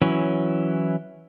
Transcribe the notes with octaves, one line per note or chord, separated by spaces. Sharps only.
E3 F#3 C#4 E4